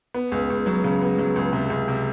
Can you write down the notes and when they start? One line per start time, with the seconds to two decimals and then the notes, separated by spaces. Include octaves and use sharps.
0.14 B3
0.32 C#2
0.50 C#2
0.66 F#3
0.84 C#3
1.01 B3
1.18 F#3
1.36 C#2
1.53 C3
1.70 C#2
1.88 C3